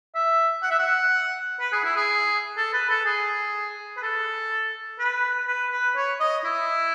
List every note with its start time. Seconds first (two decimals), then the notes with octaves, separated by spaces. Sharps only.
0.15 E5
0.62 F#5
0.70 E5
0.79 F#5
1.60 B4
1.72 G#4
1.84 E4
1.96 G#4
2.57 A4
2.73 B4
2.89 A4
3.05 G#4
3.97 B4
4.02 A4
4.99 B4
5.47 B4
5.72 B4
5.96 C#5
6.20 D#5
6.44 E4